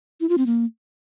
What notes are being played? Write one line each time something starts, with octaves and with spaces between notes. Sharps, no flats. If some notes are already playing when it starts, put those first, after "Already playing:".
E4
F4
C4
A#3